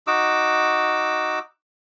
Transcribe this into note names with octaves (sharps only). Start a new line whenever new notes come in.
D#4 F#4 D6 E6